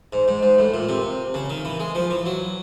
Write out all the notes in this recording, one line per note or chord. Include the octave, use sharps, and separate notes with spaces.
G#2
G#2
G#2
A2
A#2
C3
C#3
D#3
E3
G#3
F3
E3
F#3